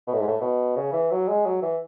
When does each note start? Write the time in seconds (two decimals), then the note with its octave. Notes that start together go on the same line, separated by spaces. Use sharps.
0.07 B2
0.14 A2
0.21 G#2
0.28 A2
0.42 B2
0.76 C#3
0.93 E3
1.11 F#3
1.29 G#3
1.46 F#3
1.62 E3